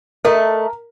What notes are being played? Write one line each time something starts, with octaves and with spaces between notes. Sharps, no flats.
A3 A#4 D#5